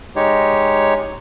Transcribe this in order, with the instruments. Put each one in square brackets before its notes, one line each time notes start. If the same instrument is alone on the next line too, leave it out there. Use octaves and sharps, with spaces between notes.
[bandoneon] G#3 D#4 G4 C#5